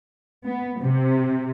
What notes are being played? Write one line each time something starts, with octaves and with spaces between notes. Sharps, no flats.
B3
C3